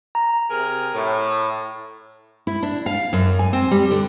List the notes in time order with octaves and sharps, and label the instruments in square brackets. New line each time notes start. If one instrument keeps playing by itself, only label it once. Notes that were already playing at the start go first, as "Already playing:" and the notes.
[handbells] A#5
[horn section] C3 G#4 A#4
A2
[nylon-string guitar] E4
D4
F5
F#2
G#5
C4
G3
D3